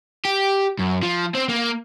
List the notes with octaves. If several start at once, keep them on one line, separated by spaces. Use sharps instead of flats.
G4
F#2
F3
C4
A#3